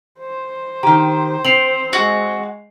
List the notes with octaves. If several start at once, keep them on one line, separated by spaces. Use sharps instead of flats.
C5
D#3 G4 A#5
C4 C7 F7 F#7
G#3 F#4